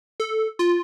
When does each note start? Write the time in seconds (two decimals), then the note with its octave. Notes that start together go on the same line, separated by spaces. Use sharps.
0.20 A4
0.59 F4